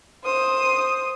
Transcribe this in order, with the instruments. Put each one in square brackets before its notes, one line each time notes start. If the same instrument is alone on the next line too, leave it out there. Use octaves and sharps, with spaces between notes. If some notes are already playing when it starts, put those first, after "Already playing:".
[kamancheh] C5 D#6